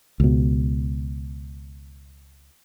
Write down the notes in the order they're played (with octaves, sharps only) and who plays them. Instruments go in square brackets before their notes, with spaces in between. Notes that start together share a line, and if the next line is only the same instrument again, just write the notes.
[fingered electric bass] C#2 B2